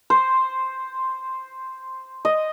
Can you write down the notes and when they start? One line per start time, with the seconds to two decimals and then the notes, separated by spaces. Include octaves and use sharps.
0.10 C5
2.25 D#5